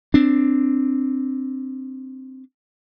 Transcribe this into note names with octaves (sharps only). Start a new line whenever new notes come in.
C4 D4